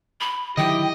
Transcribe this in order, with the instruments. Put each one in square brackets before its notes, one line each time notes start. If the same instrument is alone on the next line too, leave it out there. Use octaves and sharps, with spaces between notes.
[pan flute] B5
[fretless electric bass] D3 D#3 F#3 [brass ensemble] E4 G4 [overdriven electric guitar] D#5 [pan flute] G5